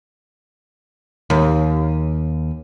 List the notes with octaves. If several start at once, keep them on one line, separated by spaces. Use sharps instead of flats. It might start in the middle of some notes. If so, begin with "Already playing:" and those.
D#2